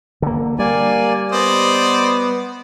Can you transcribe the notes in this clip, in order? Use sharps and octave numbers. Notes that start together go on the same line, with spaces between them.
D3 A#3
G3 A#3 D5 G#5
B3 C5 D5 D#5